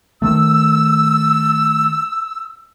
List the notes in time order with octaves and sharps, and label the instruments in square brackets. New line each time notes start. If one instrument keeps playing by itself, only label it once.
[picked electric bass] D#3 A3 [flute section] E6